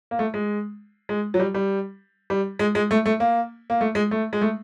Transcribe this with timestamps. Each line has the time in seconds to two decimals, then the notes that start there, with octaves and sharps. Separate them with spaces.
0.11 A#3
0.19 A3
0.34 G#3
1.09 G#3
1.34 F#3
1.40 G3
1.54 G3
2.30 G3
2.59 G#3
2.75 G#3
2.91 A3
3.06 A3
3.20 A#3
3.70 A#3
3.81 A3
3.95 G#3
4.11 A3
4.33 G#3
4.42 A3